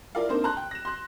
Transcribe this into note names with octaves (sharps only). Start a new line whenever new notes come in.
E4 F4 A#4 D5 F5
A#3 C4 D4 D#4 A#4 C5
A5 A#5 C6 F#6
G5
A#6 E7
C6 F#6